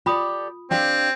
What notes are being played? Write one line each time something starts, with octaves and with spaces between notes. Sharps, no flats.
F4 G4 A4 D5 B5 D#6
C4 D4 G4 F5